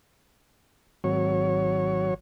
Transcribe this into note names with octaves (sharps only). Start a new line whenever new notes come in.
G#1 F#3 C#5